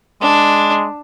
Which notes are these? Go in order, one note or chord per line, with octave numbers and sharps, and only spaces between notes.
G#3 D4